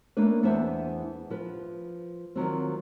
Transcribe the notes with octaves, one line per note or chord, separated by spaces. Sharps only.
A3 A#3 C#4 D4 B4
E2 B3 D4 E4 C5 E5
F3 B4
D#3 F3 F#3 C4